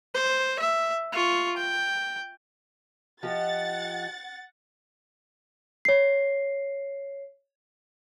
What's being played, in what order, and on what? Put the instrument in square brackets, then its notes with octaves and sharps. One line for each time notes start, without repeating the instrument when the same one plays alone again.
[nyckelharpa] C5
E5
F4 C#6
G5
[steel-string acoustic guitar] F3 G4 D#5 [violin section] F#5 A6
[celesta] C#5 C7